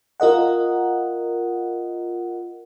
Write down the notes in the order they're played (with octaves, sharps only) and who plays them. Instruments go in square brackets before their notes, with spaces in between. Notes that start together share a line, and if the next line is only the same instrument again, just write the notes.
[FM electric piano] F4 A#4 D#5 F#5